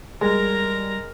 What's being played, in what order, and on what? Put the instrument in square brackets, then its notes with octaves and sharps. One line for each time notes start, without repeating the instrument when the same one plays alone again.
[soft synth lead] G3 [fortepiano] G#3 [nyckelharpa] A#4 A#5